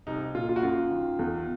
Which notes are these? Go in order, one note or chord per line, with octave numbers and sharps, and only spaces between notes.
C2 D#4
A#2 F4
F4
F#4
F#2 F4
D#3
E2